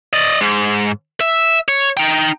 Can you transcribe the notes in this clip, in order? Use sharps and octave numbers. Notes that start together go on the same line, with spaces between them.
D5 D#5
G#2
E5
C#5
D#4 G5